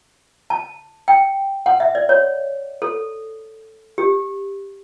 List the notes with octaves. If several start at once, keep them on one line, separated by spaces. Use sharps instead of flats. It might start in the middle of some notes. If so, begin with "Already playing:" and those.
A5
G5
F#5
E5
D5
C#5
A4
G4